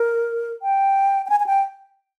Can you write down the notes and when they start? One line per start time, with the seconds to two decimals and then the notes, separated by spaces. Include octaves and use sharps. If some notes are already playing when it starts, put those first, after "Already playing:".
Already playing: A#4
0.62 G5
1.26 G5
1.30 G#5
1.40 G#5
1.46 G5